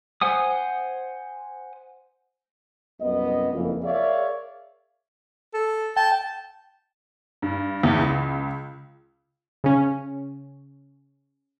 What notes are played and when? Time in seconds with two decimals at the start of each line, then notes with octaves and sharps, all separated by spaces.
0.21 C5 F#5 G#5 D#6
2.99 C2 F#2 C3 B3 D#5
3.52 F#1 F2 E3 F3 A#3 A#4
3.83 G#4 A#4 C#5 D5 E5 F5
5.54 A4
5.96 G5 A5
7.42 G2
7.83 E2
7.99 C#2
9.64 C#3 C#4